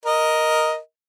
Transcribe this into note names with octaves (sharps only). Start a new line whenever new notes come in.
A#4 D#5